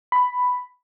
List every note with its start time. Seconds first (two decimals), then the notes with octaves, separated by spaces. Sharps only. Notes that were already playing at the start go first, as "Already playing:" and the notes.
0.12 B5